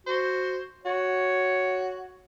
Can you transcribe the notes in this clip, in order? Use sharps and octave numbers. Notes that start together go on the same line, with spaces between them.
F#4 C5
F#4 C#5